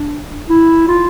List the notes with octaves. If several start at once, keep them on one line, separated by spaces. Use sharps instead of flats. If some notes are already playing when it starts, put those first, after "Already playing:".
Already playing: D4
E4
F4